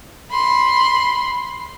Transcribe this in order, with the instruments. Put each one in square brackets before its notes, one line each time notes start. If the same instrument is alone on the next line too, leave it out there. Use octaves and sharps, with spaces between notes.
[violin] B5 C6